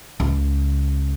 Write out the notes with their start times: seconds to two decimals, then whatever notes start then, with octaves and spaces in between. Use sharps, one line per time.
0.20 C#2